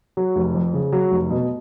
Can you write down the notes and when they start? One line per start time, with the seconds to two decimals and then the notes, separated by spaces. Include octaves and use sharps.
0.17 F#3
0.36 F1
0.54 F2
0.74 C#3
0.92 F#3
1.12 F1
1.30 B2